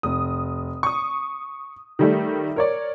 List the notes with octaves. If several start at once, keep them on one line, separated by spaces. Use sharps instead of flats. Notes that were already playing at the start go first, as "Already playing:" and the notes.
F1 D#6
C#6 D#6
D#3 G3 A3
A#4 C#5 D5